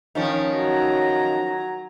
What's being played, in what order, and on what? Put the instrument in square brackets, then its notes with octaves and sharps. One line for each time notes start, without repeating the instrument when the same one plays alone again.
[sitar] D#3 F3 C#4
[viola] F#3 A#5